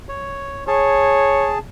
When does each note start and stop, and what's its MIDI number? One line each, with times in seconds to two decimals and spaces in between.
0.09 0.64 73
0.68 1.59 68
0.68 1.50 73
0.68 1.59 81